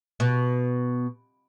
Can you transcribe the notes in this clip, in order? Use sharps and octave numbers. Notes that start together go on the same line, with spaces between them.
B2